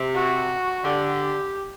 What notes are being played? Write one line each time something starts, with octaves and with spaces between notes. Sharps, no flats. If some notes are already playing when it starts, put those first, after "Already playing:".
Already playing: C3
F#4
D3 G4